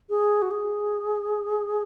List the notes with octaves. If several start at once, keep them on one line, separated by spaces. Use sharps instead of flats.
G#4
F#4
G#4